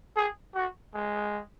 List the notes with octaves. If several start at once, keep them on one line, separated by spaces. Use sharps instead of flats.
G#4
F#4
G#3